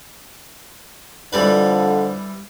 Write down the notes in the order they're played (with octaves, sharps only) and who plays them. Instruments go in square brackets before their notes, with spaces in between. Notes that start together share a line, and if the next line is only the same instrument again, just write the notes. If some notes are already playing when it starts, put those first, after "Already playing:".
[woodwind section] F2 D3 [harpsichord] E3 G3 B4